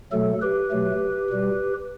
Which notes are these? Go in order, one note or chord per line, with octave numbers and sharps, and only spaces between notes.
B2 F#3 A3 A4
G4 B4
B2 F#3 A3
B2 G3